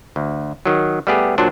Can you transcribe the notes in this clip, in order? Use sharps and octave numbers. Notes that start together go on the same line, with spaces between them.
D2
D#3 F#3
G3 A3 B3 G4 G#4
A#2 F#3 D4 C5